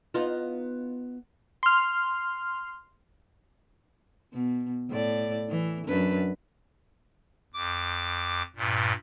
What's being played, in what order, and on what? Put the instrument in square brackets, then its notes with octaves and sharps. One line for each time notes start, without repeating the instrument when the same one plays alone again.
[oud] B3 D#4 F4
[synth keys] C6 F6
[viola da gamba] B2
A2 D5
E3
F#2 D4 B4
[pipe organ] F2 D6
G2 A#2